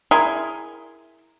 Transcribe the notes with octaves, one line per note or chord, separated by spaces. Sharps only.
E4 G#4 A#4 C6